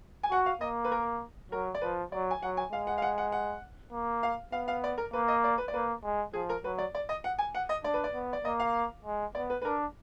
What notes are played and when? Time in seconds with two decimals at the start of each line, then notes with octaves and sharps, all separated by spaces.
0.23 G#5
0.31 F#4 F#5
0.46 F5
0.61 A#3 D#5
0.85 B4
0.91 A#4
1.52 F#3 A#4
1.75 D5
1.82 F3 B4
2.12 F#3 D5
2.31 G#5
2.42 F#3 F#5
2.57 G#5
2.72 G#3 F5
2.87 F#5
2.98 F5
3.02 F#5
3.18 F#5
3.32 F#5
3.92 A#3
4.23 F5
4.52 B3 F5
4.68 F5
4.84 D5
4.98 A#4
5.13 A#3 B4
5.28 D#5
5.44 D5
5.58 B4
5.68 D5
5.74 A#3 B4
6.04 G#3
6.33 F3 G#4
6.49 A#4
6.64 F#3 B4
6.78 D5
6.95 D5
7.09 D#5
7.24 F#5
7.39 G#5
7.55 F#5
7.69 D#5
7.84 D4 D5
7.94 B4
8.04 D5
8.14 B3
8.33 D5
8.44 A#3 D#5
8.60 F5
9.05 G#3
9.35 B3 D5
9.50 B4
9.62 B4
9.65 D4 A#4